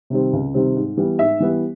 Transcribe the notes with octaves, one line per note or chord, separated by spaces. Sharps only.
C3 D#3 G3 C4
C#2
C3 D#3 G3 C4
G#2
E3 G3 B3
G#2 E5
E3 G3 B3